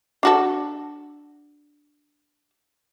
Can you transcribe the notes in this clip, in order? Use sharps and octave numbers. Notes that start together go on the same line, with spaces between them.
D4 F#4 A4